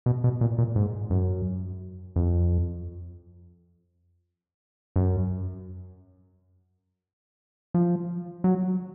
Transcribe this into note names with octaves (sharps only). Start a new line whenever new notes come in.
B2
B2
A#2
A#2
G#2
F#2
F2
F#2
F3
F#3